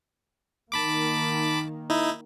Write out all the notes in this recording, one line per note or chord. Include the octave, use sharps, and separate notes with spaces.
D#3 A#3 A5 B5 D6
D#4 E4